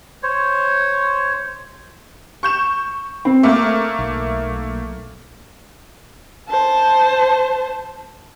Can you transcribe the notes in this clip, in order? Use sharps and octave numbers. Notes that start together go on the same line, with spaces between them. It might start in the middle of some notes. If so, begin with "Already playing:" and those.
C5 C#5
C#6 G6 E7
C4
A3 A#3 A#4 D6
B1
C5 A5